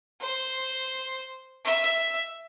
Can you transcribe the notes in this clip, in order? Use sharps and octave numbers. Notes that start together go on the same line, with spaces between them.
C5
E5